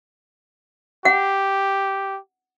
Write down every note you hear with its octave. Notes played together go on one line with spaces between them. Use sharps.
G4 F#5